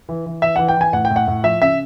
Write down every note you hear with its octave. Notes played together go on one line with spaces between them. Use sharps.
E3
E3
E3 E5
E3 F#5
G5
E3 G#5
A2 F#5
G5
A2
F#5
A2
F3 E5
C#3 E5